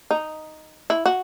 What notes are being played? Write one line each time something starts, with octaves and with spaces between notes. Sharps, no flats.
D#4
E4
F#4